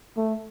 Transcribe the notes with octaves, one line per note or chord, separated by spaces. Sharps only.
A3